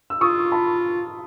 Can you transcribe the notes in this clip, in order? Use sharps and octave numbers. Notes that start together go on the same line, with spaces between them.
E6
F4 C#6 D#6
A5 B5